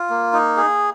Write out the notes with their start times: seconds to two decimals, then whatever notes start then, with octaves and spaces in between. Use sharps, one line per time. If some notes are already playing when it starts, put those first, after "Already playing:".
Already playing: F4
0.10 A#3
0.33 D#4
0.57 G#4